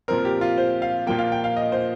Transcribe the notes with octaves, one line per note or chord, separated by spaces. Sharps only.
A#2 F3 C4 A#4
G4
F4
C5
F5
A#2 F3 A#3 G5
F5
G5
F5
D#5
C5